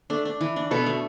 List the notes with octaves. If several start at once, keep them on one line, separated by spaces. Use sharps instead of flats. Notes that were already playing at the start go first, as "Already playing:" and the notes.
A3 D4
D4
E3
D4
B2 B3 A4
A3